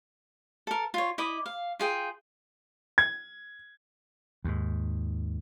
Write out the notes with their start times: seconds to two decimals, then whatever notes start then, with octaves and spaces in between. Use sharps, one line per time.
0.67 A4 A#4
0.94 F4 C#5
1.18 E4 D#5 B5 D6
1.46 F5
1.80 F4 G#4 G5
2.98 G#6
4.44 D#2 G#2